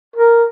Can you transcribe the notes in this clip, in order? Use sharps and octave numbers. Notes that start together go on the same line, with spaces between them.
A#4